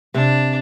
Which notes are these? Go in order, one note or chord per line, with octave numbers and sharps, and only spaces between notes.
C3 D4